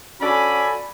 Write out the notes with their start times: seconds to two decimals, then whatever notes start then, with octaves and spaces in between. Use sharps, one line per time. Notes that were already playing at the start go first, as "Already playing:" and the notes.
0.21 C#4 F#4 A4 D5 G#5 B5